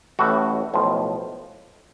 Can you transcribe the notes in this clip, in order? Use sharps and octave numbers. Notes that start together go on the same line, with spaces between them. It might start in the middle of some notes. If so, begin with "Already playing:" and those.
A1 A2 E3 A3 F#4
B1 A2 F3